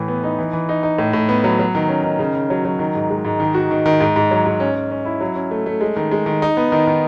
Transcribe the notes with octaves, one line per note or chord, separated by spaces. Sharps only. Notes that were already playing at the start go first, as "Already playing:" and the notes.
Already playing: A2 E3
B3
D#4
E3
E3
D#4
D#4
A2
A2
B3
F#3
F#3
D#3
C#4
D#3
C#3
C#3
F#3
F#3
D#3
G#2
G#3
G#2
D#3
F#4
D#3
D#3
G#2
G#2
F#3
G#2
C#4
C#4
C#4
E4
F#3
C#4
A3
A3
G#3
D#3
G#3
D#3
D#4
B3
D#3
D#3